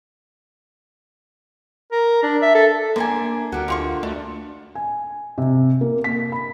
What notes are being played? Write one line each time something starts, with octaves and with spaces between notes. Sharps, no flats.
A#4
D4
E5
A4
D3 A#3 D4 G#5
D2 F#4 G4 A#4
D3 F4 C#6
A3 D4
G#5
C3
A#3
B6
B5